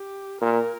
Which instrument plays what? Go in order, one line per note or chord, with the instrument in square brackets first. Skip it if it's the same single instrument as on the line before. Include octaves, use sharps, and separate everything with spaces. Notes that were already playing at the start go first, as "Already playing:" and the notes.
Already playing: [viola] G4
[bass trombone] A#2 [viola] A#4